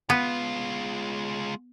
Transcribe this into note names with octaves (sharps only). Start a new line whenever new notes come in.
G#3 B3 F4